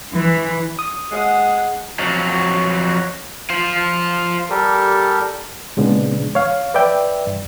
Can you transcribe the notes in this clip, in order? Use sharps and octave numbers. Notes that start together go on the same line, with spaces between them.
E3
D#6
G#3 F#5
F2 F#3
F4 C5
G3 G4 A4 A#4
A#2 C#3 G#3 B3 C4 D4
C#5 F5
B4 D5 E5 G5
G2